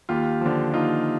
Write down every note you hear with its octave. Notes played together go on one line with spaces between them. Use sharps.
D#2 F4 G4
D3 F3
D#2 D#4 F4